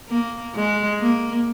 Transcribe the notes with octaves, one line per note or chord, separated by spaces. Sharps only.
A#3
G#3
A#3